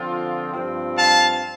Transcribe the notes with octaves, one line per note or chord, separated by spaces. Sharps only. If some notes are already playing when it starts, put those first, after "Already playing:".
Already playing: D3 F3 C4 F4
G2 F3 C4
F5 A5